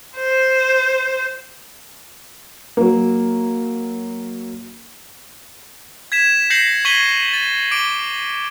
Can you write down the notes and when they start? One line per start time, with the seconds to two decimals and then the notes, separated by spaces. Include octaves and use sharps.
0.17 C5
2.77 F#3 A#3
6.12 G#6 B6 E7
6.50 G6 A#6 C7 C#7 F#7
6.85 C#6 G#6 B6 D#7 F#7 G7
7.33 A6
7.71 D6 D7 G7